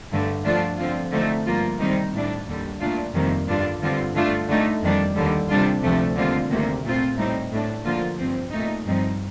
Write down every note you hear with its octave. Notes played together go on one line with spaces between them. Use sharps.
G2 D3 A3
D3 F3 A3 D4 F4
D3 F3 C4 F4
D3 F3 A3 C4 D#4
G2 F3 A#3 F4
C3 D#3 G3 C4 D#4
A2 G3 D4
D#2 D3 G3
A#2 A3 D4 F4
F2 C3 D#3 G3 A#3
G2 D3 G3 D4 F4
G2 D3 G3 C4 F4
D3 A3 D4 F4
D3 A3 D#4
F2 D#3 G3 D4
D#2 D3 G3
C3 G3 D4 F4
D2 C3 F3 A3
D#2 D3 G3 C4 F4
D2 C3 D#3 A#3
A#2 A3 C4 F4
A2 G3 C4 D#4
A2 A3 D4
D3 F3 A#3 F4
G2 F3 C4
A#2 A3 D#4
G2 F3 C4 D#4